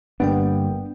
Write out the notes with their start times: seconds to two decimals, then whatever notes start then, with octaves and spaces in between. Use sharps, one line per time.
0.20 G1 G2 A#3 B3 D4 G5